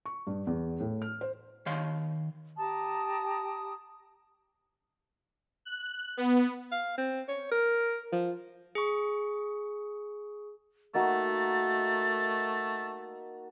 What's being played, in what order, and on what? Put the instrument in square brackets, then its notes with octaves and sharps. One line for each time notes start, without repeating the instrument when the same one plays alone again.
[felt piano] C#6
G2
E2
A2
F6
C5
[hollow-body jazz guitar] D#3 C#5 F5 C6
[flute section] G4 A5 A#5 D#6
[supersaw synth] F#6
B3
[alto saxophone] F5
C4
C#5
A#4
F3
[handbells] G#4 C#6
[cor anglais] A3 [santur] A#3 D#4 F#4 [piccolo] A6